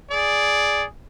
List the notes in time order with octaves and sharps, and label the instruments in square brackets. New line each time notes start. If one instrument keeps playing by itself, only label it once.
[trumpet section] G#4 D5